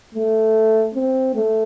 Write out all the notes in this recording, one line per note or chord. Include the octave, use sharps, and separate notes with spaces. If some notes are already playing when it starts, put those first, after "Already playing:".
A3
C4
A3